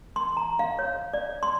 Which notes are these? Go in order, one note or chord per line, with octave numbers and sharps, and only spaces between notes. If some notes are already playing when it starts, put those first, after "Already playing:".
C6
A#5
F5
C#5
D5
C6